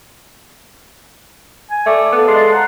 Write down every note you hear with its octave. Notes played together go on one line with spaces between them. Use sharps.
G#5
A3 D5
B3 A4 F5
G#3 C6
C5 F#5 A#5